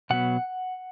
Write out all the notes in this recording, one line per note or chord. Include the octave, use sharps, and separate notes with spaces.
B2 F#3 B3 F#5